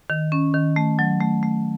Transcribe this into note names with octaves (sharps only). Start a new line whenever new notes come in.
D#3
C#4
D#3
A3
F#3
A3
A3